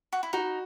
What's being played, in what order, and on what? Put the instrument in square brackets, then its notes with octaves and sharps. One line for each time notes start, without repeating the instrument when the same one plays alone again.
[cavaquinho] F#4
E4
[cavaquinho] D#4 [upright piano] F#4